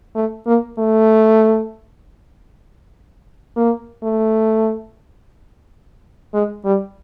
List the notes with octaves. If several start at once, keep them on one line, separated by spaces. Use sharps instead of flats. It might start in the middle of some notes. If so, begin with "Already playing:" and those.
A3
A#3
A3
A#3
A3
G#3
G3